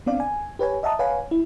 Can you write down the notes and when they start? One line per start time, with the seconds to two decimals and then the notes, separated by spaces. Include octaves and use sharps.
0.06 B3 C4 D4 D5 F5
0.20 G#5
0.59 G4 B4 C#5 G#5
0.83 D#5 E5 F#5 A5 A#5 D#6
0.99 B4 C#5 F5 F#5 G#5
1.31 E4